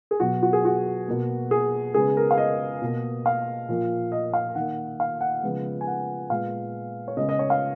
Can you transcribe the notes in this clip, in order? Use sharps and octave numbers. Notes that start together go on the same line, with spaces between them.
G#4
B2 F#3 B3 F#4
F#4
G#4
F#4
B2 A#3
G#4
C#3 G#3 B3 G#4
A#4
F5
D#5
B2 A#3
F5
A#2 F3 A#3
D#5
F5
D#3 A#3 F#5
F5
F#5
C#3 F3 G#3 B3
G#5
F#5
A#2 G#3 B3 F5
C#5
C#3 G#3 B3 D#5
D#5
C#5
F5